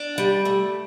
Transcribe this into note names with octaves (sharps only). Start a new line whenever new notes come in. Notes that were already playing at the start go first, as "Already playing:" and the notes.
Already playing: D4
G3
A3